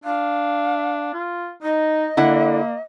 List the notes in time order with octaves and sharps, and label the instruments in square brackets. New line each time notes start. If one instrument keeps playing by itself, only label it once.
[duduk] D4 [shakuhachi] F5
[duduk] F4
[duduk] D#4 [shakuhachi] D#5
[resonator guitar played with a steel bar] D3 E4 F#5 [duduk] A#3